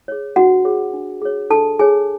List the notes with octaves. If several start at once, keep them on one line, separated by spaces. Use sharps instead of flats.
G#4 C#5
D4 F#4 F#5
G#4 C#5
D4
G#4 C#5
D4 A4 A5
G#4 C#5 G#5